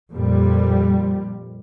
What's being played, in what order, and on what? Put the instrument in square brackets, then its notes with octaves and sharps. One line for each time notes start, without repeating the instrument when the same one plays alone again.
[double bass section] F2 A#2 G3